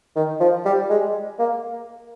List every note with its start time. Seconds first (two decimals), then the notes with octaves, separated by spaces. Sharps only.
0.16 D#3
0.41 F3
0.65 G3
0.90 G#3
1.39 A#3